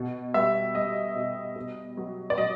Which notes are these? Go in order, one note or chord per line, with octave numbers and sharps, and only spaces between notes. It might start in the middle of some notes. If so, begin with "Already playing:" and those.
Already playing: B2
G3 E5
G3 D#5
B2
B2
F#3
D5
F#3 D#5